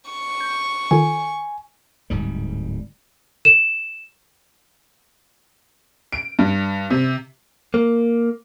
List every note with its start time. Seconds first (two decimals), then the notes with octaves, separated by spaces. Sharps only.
0.11 C#6
0.40 G6
0.91 D#3 F4 A4 G#5
2.10 D1 G#2 G3
3.45 E7
6.12 D7
6.39 G2
6.90 C3
7.74 A#3